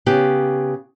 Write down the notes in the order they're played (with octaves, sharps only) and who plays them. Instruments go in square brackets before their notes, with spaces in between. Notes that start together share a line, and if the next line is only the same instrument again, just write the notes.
[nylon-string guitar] C#3 B3 G4